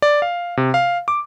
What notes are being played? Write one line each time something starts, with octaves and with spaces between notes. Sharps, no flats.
D5
F5
C3
F5
D6